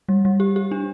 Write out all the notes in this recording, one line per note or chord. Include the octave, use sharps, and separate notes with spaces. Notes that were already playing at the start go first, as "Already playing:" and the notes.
G3
G3
G4
G4
D4